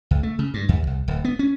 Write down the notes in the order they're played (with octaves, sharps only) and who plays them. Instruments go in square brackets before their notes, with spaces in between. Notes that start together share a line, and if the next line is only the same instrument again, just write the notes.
[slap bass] C#2
A3
C#3
G2
D#2
C2
D1
B3
C#4